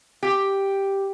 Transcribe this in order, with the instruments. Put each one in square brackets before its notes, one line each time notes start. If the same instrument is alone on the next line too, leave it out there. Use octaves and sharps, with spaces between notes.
[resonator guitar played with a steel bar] G4